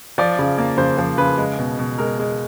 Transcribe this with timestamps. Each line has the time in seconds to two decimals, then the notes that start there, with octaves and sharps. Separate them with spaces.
0.18 F3 D5
0.39 C#3
0.58 A#3
0.78 C#3 C5
0.98 F3 C5
1.18 C#3 B4
1.38 G#3
1.59 B2
1.79 B2
1.98 G#3 A#4
2.19 G#3